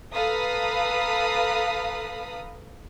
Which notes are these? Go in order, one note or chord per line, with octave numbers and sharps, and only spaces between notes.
A4 B4 F5 A#5 B5 D#6